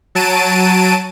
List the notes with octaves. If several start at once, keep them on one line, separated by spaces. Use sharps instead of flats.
F#3 A5 D7 D#7